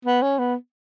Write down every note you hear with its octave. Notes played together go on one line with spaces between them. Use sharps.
B3
C#4
B3